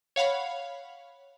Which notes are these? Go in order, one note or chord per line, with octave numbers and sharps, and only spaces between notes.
C#5 F5 F#5 B5